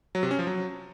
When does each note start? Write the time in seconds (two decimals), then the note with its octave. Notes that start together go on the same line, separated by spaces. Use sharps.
0.15 F#3
0.23 C3
0.31 C#4
0.39 F3
0.47 F#3